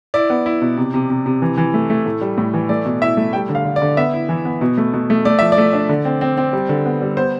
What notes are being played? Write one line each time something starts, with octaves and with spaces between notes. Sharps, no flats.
E4 D5
B3
E4
B2
C3
C3
C3
C3
E3
E3
A3
A3
A2
G3
A2
E3
A3 D5
B2
E4 E5
A3
G3 G5
D3
F5
D3
D5
D3
B3 E5
E4
E3
B3
B2
A3
B2
A3
A3 D5
F3 E5
D5
A3
D4
D3
C4
C4
C4
G3
D3
B3
G3
B3 C5